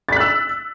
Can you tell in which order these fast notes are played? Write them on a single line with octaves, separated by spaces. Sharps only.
A6 B6 F#6 E6